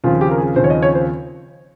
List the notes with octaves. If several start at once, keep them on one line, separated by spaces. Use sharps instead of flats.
D#2 C#3 F3 C4 F4
G4
A#4
G#4
D#2 C#3 F3 C4 C5
C#5
D#5
C#5
C5